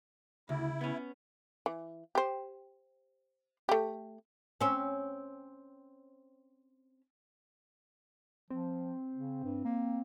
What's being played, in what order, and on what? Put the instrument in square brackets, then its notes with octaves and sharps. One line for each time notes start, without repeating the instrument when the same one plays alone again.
[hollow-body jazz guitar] D2 [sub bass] C#3 [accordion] E4
[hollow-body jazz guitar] B3 C#4
[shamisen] E3
G4 C5
A3 G4
[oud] C4 C#4
[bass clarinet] F3 [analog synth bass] C4
[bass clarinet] C#3
G2
A#3